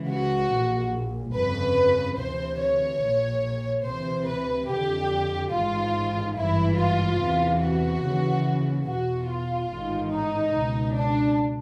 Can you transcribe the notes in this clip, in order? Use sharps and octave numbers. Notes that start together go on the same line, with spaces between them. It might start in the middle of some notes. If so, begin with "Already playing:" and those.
Already playing: C#2 C#3 E3
F#4
A#1 A#2
G1 F2 C#3 B4
D2 C3 E3 C5
C#5
A#1 A#2
D2 C3 E3 C5
B4
F2 D3 G4
A1 G#2 D#3 F4
G#1 G2 E3 E4
F4
E2 C3 E3
F#4
D#2 C#3 E3
E2 B2 F#4
F4
A1 G#2 D#3
D#4
C#2 B2
D4